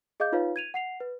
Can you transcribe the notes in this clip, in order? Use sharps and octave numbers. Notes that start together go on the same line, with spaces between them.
G#4 D#5 F5 D6 G6
D#4 F4 B4 C#5 F5
G#6 D#7 F7
F#5 C7 F7
B4